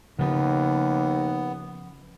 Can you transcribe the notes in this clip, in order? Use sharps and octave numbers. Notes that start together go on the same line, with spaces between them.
D#2 C#3 F3 B3